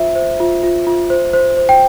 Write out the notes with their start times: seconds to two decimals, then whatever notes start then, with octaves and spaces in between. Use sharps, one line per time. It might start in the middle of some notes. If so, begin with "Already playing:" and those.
Already playing: F4 C5 E5
0.15 C5
0.40 F4
0.63 F4
0.87 F4
1.10 C5
1.33 C5
1.57 C5
1.69 G5